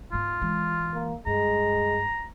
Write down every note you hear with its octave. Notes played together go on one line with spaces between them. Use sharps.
G#2 B3 F4
E3 G#3
A#3
G2 G#3 A#5